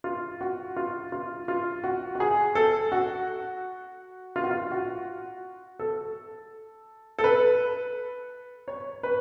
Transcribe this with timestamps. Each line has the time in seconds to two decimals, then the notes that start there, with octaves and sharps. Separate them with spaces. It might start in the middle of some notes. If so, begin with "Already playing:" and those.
0.04 F4
0.41 F#4
0.77 F4
1.12 F4
1.48 F4
1.84 F#4
2.15 F#4
2.20 G#4
2.55 A4
2.92 F#4
4.36 F4
4.43 F#4
4.51 F4
4.71 F#4
5.79 A4
7.19 A4
7.24 B4
8.68 C#5
9.03 B4